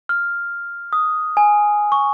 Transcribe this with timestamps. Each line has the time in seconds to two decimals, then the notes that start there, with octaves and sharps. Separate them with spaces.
0.09 F6
0.93 D#6
1.37 G#5
1.92 C#6